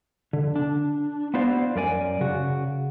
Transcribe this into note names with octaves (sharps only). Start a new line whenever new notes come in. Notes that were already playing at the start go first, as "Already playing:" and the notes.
D3
D4
B3 E4 F#4 C5 D5 F5
F#2 A#4 D5 G#5
C#3 F#4